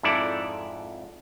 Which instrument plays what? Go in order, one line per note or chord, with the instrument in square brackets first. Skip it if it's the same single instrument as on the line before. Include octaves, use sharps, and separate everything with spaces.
[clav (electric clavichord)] F2 G#2 E4 A4 D5